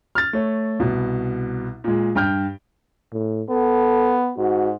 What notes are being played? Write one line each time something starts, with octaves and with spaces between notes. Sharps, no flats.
F6 A6
A3 C#5
C2 B2
A#2 G#3
G2 G5 F6 G6
A2
B3 A4
G#2 F#4